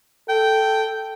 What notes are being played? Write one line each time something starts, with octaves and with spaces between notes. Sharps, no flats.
A4 G5